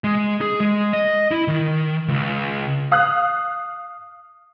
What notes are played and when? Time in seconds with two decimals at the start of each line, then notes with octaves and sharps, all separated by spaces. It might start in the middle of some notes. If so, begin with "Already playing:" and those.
0.04 G#3
0.41 G#4
0.60 G#3
0.93 D#5
1.31 E4
1.48 D#3
2.08 C#2
2.92 F5 D#6 F6 F#6